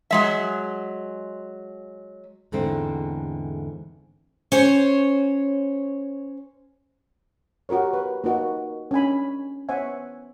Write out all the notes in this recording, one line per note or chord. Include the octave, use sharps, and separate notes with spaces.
F#3 G#3 E5
E2 G#2 D3 A3 C4 A4
C#4 C5 C#5
F#4 G4 A#4 C#5
B4
A#3 D#4 F#4 D#5
C#4 D4 G#5 B5
B3 C5 C#5 E5 F#5 G#5